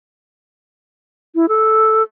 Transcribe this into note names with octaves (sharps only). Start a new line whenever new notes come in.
E4
A4